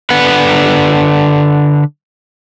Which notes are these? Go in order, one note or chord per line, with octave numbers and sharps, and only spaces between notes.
D3 B4 F#5